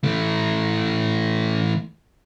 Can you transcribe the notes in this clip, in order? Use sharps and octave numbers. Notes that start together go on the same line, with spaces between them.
E3 A3